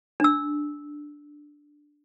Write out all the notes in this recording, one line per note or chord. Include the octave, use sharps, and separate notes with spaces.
D4 E6